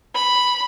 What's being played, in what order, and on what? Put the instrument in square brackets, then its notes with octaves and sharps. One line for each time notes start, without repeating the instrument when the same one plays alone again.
[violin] B5